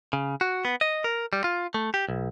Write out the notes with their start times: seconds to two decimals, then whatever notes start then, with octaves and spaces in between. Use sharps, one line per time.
0.13 C#3
0.41 F#4
0.65 B3
0.81 D#5
1.04 A#4
1.33 G3
1.44 F4
1.74 A3
1.94 G4
2.08 B1